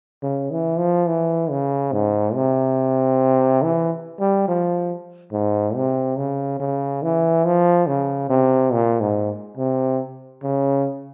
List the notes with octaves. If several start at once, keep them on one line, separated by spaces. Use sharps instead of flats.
C#3
E3
F3
E3
C#3
G#2
C3
E3
G3
F3
G#2
C3
C#3
C#3
E3
F3
C#3
C3
A#2
G#2
C3
C#3